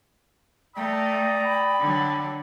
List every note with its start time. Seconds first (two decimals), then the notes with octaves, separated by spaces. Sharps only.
0.76 A3 D5 G5 A#5 D#6
1.44 B5
1.80 D3 F#3